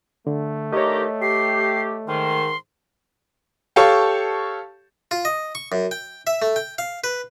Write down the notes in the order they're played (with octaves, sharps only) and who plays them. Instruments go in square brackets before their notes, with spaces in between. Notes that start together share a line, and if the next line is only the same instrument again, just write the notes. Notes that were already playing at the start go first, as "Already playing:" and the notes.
[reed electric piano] D3 [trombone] A3
[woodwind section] D3 D#3 G4 [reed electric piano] C#5 D#5 [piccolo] A#5
[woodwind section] G4 [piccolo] C7
[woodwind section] G#2 D#3 [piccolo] C6
[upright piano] G4 A4 C#5 F5 A5 C#6
[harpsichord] F4
D#5
C#6
F#2
G5
E5
A3
G5
F5
B4